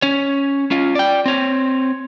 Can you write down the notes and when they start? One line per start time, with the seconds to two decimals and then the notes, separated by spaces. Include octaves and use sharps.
0.02 C#4 C#5
0.71 C#4 F4
0.95 D5 G5
1.26 C4 C#5